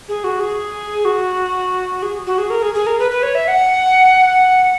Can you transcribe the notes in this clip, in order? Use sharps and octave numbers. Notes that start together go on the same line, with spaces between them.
G#4
F#4
G#4
F#4
G#4
F#4
G#4
A#4
G#4
G#4
A#4
B4
B4
C#5
E5
F#5